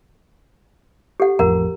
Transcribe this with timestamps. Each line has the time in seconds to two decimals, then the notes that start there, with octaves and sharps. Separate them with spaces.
1.20 G4 A4 F#5
1.39 A1 F2 A#4 F#5 A#5